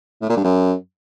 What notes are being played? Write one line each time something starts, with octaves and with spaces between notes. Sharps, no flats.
A2
A#2
G2
F#2